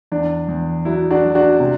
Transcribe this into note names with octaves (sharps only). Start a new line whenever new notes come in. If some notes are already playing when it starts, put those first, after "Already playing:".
E2 D4
E2
F#3 E4
D4 F#4
F#3
D4 F#4
C3